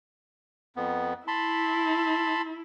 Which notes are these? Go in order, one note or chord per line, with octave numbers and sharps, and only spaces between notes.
F2 B3
E4 A5 B5 C6